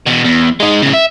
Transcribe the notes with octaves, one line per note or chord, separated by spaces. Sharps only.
E2 B2
E2
G#3 D#4
A2 C#3
E5